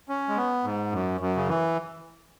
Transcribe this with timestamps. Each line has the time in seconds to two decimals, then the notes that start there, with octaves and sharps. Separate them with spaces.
0.09 C#4
0.28 G#3
0.37 B3
0.64 G#2
0.92 F#2
1.21 F#2
1.37 C#3
1.48 E3